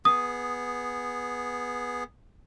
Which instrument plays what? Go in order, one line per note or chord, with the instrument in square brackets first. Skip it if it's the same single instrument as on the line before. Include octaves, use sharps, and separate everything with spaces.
[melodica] B3 G#4 [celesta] D#6